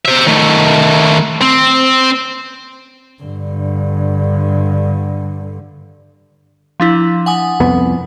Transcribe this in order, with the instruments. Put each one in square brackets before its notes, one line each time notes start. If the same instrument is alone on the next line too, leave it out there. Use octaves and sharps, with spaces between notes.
[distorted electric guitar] C5 E5
D#3 A3
C4
[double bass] G2 D3
[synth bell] F3 D4 E4
F#5 G#5 D#6
[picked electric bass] C2 F2 B3